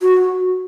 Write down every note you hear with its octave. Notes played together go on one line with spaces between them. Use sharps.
F#4